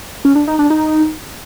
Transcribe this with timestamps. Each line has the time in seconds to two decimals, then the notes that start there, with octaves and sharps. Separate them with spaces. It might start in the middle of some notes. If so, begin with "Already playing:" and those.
0.25 C#4
0.35 D4
0.48 D#4
0.59 D4
0.70 D#4